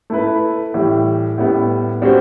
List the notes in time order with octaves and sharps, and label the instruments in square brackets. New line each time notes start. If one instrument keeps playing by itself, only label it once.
[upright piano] A3 E4 B4
A2 E3 G3
A2 G3 B3
G3 B3 F#4 C5